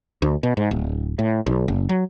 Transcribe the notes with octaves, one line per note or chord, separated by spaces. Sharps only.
D2
B2
G#2
D1
A2
B1
F#1
F#3